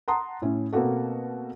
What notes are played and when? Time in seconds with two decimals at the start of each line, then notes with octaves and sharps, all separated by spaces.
0.08 F#5 A5 A#5 C6 D#6
0.42 A2 C#4 E4
0.73 B2 A#3 C4 F#4 A4